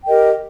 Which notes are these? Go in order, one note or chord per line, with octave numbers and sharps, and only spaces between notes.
G4 A#4 D#5 G5